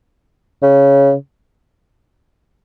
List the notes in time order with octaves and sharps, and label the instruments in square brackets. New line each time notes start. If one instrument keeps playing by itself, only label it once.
[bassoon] C#3